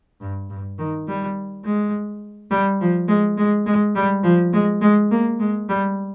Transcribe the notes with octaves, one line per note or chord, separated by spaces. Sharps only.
G2
G2
D#3
G3
G#3
G3
F3
G#3
G#3
G#3
G3
F3
G#3
G#3
A#3
G#3
G3